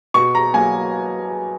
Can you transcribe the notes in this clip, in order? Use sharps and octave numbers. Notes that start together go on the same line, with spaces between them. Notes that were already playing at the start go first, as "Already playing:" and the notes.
B2 C#6
A#5
F#3 A#3 G#5